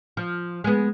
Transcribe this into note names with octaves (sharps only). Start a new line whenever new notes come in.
F3
G#3 B3